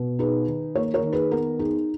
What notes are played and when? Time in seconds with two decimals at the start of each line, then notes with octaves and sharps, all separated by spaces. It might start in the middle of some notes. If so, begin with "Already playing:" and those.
Already playing: B2
0.19 D#4 G#4 B4
0.47 D#3
0.75 A#3 A#4 C#5
0.94 A#4 C#5
1.03 D#3
1.13 G#4 B4
1.31 B3 A#4
1.59 D#4 G#4